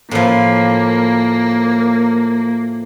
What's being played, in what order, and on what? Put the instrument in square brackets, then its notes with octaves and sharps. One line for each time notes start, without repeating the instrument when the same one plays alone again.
[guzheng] A2 F3 [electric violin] A#3